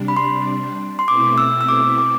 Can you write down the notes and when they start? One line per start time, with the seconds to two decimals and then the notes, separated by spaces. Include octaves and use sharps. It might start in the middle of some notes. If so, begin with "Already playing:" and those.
Already playing: C3 G3 D4
0.08 B5
0.17 C6
0.99 C6
1.07 B2 A3 C4 E4 D6
1.38 E6
1.61 E6
1.68 D6
1.98 D6